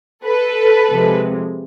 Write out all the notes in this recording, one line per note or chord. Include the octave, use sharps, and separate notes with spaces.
A4 B4
C3 F3 G#3